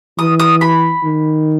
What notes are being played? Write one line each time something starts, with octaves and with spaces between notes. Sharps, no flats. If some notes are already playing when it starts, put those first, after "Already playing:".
E3 D#6
D#6
B5
D#3